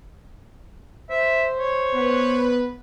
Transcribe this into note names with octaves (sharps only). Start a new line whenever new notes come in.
C5 E5
C#5
B3 B4